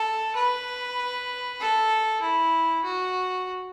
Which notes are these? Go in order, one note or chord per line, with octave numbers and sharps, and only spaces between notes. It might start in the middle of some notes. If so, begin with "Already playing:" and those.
Already playing: A4
B4
A4
E4
F#4